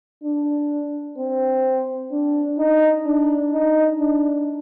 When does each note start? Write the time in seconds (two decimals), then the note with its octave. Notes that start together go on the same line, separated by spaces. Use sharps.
0.24 D4
1.17 C4
2.11 D4
2.58 D#4
3.05 D4
3.53 D#4
3.99 D4